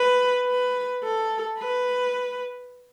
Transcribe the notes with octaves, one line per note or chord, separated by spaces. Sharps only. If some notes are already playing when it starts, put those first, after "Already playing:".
Already playing: B4
B4
A4
B4